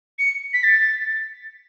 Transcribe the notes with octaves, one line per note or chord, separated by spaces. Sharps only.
C#7
B6
A6